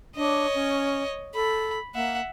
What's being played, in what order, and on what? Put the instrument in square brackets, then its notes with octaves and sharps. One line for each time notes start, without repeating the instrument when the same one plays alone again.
[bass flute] D4 [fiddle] C#5 D#5
[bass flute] C#4
[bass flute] A4 [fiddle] B5
[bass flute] A#3 [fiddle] E5 F#5